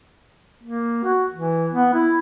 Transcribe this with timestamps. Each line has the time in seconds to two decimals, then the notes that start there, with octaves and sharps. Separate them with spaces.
0.63 A#3
1.04 F#4
1.34 E3
1.72 B3
1.94 E4